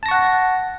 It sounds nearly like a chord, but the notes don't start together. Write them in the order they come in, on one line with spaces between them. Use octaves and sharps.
A5 A#6 C#6 F#5